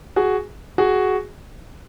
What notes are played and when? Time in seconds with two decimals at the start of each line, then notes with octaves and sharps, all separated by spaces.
0.16 F#4 G#4
0.78 F#4 G#4